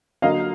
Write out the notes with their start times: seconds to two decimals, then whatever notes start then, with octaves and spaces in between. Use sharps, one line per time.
0.22 D3 F#3 A#3 D#5 F5